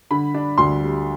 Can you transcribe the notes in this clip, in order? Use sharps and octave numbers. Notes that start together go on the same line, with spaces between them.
D3 B5
D4
D2 C6
G3